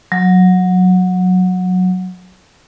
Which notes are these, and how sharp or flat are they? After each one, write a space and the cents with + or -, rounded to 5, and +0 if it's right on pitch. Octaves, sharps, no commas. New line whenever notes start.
F#3 -15